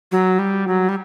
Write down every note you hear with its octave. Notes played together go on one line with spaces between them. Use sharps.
F#3
G3
F#3
G3